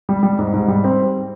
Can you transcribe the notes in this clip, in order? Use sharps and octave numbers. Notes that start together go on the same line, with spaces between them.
G3
G3
G#2
G#2
G3
C4